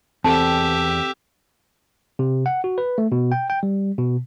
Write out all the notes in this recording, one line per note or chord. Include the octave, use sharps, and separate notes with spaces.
E2 C4 G4 A4 E5 A5
C3
F#5
F#4
B4
A3
B2
G5
G5
G3
B2